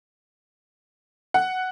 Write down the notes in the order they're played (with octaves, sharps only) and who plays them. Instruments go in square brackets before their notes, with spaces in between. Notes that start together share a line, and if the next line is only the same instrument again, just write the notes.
[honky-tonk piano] F#5